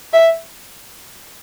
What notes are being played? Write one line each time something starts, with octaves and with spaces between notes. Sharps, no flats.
E5